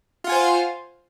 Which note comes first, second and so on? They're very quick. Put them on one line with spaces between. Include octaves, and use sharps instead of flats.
F4 F#5 G#5 C5 F5